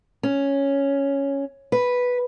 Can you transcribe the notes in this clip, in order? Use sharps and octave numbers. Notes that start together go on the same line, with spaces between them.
C#4
B4